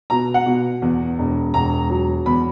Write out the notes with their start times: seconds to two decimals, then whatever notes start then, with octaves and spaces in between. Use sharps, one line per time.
0.10 B2 A#5
0.34 F#5
0.46 B2
0.82 E2
1.18 E1
1.54 E1 A#5
1.90 F#3
2.26 E2 B5